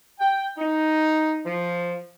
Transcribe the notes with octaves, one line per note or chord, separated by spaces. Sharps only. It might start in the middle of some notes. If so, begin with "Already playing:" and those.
G5
D#4
F3